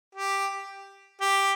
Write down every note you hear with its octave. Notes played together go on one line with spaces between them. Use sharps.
G4
G4